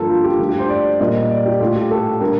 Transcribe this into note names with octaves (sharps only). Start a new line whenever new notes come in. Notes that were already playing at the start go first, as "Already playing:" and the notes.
Already playing: G2 D3 F3 A#3 A4 A#4
F4
G4
G2 F3 A3
G4
C5
D5
A#2 G3 A#3 D#5
D5
G4
A2 A3 F4
G4
A4
D3 G3 A#3 A#4